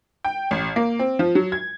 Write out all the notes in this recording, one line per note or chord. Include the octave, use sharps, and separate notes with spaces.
G5
A1
A#3
C4
F3
F#3
G#6